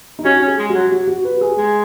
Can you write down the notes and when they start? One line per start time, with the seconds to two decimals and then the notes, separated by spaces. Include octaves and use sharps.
0.19 D#4
0.24 C#4 F#4
0.42 C#4
0.47 G#4
0.59 G#3
0.69 F#4
0.75 F#3
0.92 F#4
1.07 F#4
1.25 B4
1.37 F#4
1.41 G#4
1.58 G#3